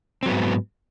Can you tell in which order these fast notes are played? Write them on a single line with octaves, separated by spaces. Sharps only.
C4 F#3 B3 G#2